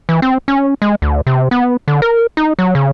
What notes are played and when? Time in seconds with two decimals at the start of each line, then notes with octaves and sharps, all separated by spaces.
0.09 E3
0.22 C4
0.48 C#4
0.82 G#3
1.02 D2
1.27 C3
1.51 B3
1.88 D3
2.02 A#4
2.37 D#4
2.59 F#3
2.75 C#3